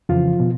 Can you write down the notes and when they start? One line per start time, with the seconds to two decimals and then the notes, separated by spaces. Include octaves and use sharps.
0.09 F2 C#3 E3 F3 F4
0.40 B2